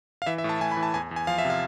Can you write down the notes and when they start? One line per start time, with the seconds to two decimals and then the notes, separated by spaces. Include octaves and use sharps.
0.22 F5
0.27 E3 E5
0.38 E5
0.44 A2
0.49 A5
0.61 A2 G#5
0.72 B5
0.77 E3
0.83 A5
0.94 E2 G#5
1.11 E2
1.16 G#5
1.27 F3 F5
1.38 E5
1.45 C3
1.50 F5